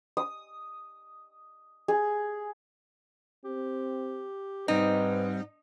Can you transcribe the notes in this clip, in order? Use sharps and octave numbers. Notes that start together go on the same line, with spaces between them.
D#6
G#4
C4 G4
G#2 G3 C4 D#4 B4